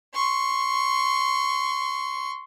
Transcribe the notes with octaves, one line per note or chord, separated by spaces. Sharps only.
C6 C#6